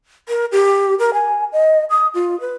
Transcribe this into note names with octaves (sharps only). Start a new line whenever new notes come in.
A#4
G4
A#4
G#5
D#5
D#6
F4
B4